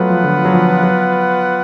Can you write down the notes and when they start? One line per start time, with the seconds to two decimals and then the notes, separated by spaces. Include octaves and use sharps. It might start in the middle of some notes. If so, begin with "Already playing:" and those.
Already playing: F#3 A3 B3 F4 B4 F#5
0.09 F3
0.23 D3
0.45 F#3
0.53 F3
0.83 F#3